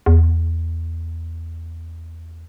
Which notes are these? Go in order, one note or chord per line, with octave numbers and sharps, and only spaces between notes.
E2